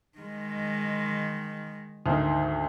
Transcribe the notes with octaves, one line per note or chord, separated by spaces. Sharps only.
D#3 G#3
D2 G#2 D#3